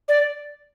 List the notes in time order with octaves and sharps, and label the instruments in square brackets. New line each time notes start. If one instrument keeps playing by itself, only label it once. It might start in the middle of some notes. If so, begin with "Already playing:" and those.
[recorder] D5